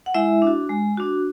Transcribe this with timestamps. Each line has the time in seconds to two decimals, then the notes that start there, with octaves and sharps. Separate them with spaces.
0.06 F#5
0.14 G#3 E4 E5
0.42 D4 F#4
0.69 G#3
0.98 D4 F#4